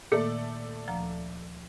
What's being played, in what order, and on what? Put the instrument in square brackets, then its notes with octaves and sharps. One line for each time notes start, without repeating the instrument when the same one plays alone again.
[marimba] A#2 D#3 A#3 [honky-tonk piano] A3 A4 D5
[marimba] D2 F3 A#5